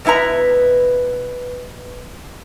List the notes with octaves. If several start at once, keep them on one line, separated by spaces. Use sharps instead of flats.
B2 B3 E4 B4 A#5